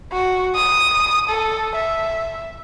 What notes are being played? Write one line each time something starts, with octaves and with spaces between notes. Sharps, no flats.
F#4
D#6
A4
E5